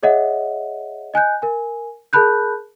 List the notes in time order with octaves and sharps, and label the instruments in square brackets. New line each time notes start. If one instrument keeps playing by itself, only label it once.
[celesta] G#4 C#5 D#5 E5 F#5
D#5 G#5 F#6 G6
A#4 G#5
G#4 A#4 A5 B5 F#6 G6